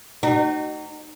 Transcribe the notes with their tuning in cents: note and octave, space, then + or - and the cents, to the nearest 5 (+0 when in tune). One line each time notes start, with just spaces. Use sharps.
D#4 -25 F#4 +40